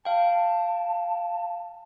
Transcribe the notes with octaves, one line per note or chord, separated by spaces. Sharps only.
F5 G5 A5